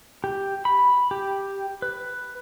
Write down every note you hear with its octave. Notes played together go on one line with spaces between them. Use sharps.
G4
B5
G4
B4